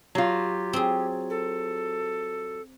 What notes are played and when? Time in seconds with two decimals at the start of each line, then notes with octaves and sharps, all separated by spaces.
0.15 F#3 F4 G4
0.73 C4 G#4
1.30 A4